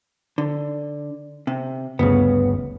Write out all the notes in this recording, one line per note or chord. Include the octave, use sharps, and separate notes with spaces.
D3
C3
G1 D2 C#3 B3